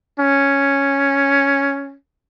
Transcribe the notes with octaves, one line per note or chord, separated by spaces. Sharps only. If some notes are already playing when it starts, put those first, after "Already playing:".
C#4